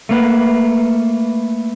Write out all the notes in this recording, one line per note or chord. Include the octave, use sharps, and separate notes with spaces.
A3 A#3 B4